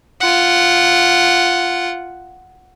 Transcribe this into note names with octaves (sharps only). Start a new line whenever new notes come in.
F4 F#5